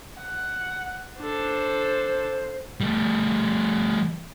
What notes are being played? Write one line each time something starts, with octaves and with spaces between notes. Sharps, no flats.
F#5
D4 A4 C5
G3 A3